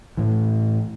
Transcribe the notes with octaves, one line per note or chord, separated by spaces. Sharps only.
A2 E3